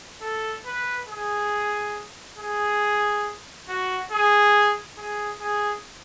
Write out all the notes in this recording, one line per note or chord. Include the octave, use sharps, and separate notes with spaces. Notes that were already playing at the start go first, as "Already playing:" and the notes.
A4
B4
G#4
G#4
F#4
G#4
G#4
G#4